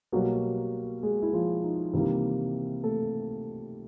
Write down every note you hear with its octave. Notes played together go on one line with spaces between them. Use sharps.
B2 F#3 G3 A#3 F#4
G#3 G#4
E4
F3 F4
D#4
C3 D#3 E3 G3 A#3 E4
A3 A4